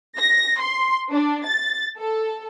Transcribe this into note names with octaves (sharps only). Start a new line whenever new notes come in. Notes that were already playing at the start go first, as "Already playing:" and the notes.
A#6
C6
D4
A6
A4